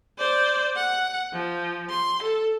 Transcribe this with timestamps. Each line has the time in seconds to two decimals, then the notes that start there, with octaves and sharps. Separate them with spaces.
0.18 C5 D5
0.76 F#5
1.33 F3
1.90 C6
2.22 A4